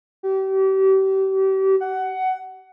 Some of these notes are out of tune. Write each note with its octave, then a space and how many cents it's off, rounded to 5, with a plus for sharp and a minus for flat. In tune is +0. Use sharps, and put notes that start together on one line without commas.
G4 -35
F#5 +15